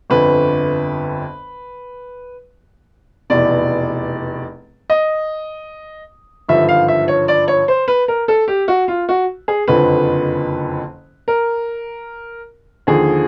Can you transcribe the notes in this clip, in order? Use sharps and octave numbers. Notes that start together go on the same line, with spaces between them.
G1 F2 D3 B4
F1 E2 B2 D5
D#5
G#1 G2 D3 F3 E5
F5
E5
C#5
D5
C#5
C5
B4
A#4
A4
G4
F#4
F4
F#4
G#4
F#1 F2 D3 F3 B4
A#4
D#2 D3 F3 G#4